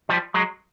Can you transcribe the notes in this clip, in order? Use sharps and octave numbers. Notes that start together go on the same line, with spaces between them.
F3 G3
F#3 G#3